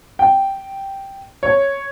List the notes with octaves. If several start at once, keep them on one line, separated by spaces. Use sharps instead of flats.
G5
C#5